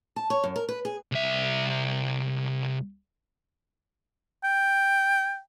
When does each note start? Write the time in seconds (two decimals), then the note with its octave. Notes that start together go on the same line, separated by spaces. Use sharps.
0.16 A5
0.30 C#5
0.44 F#2
0.56 A#4
0.69 B4
0.85 G#4
1.12 C2 E5
4.44 G5